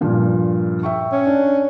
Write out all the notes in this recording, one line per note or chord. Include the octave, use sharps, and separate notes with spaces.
G2 A#2 F3
E5 G5 C#6
C#4
D4